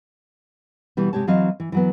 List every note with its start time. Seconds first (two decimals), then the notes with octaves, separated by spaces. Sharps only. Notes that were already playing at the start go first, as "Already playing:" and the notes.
0.97 B2 E3 G3
1.13 C3 G#3 G4 C#5 A5
1.27 E3 F#3 C4 D#5 F5
1.60 E3
1.72 E3 F#3 B3